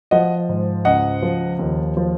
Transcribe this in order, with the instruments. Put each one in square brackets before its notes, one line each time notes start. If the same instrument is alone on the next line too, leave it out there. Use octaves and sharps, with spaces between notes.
[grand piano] F3 D#5 F#5
G#2
C#2 D#5 F#5
F3
D#2
F3